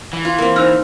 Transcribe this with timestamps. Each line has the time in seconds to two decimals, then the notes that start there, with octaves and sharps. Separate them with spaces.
0.13 E3
0.25 F4
0.38 A#3 C4
0.56 D#4 C5 E6 F6